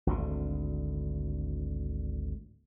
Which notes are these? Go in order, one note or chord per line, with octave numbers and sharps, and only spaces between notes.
G#1 D2 D3